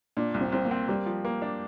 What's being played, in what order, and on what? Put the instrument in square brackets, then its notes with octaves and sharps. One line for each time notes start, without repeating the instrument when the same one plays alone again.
[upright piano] A#2 [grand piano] D4
[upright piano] C2
[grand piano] C4
[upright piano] C2 [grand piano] C4
[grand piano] A#3
[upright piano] C4
[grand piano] G3 [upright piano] A#3
[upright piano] F3
A#3
D4